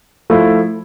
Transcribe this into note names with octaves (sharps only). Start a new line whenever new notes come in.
F3 A3 E4